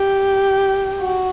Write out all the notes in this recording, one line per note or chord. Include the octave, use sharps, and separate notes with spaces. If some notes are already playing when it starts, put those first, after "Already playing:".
Already playing: G4
F#4